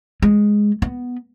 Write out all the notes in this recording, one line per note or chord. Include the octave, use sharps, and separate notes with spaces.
G#3
B3